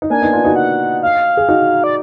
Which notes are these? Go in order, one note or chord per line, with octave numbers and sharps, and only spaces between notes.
D#4
A#3 D4 G#5
B3 D#4
D4 F4
D#4 F#4
F#5
F5
G#4
D#4 F#4
D5